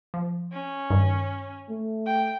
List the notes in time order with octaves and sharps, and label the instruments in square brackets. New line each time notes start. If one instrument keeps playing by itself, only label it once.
[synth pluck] F3
[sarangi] C#4
[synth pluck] G2 D#3
[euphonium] A3
[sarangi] G5